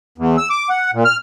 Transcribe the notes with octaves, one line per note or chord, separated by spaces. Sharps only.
E2
E6
D6
F#5
A#2
F6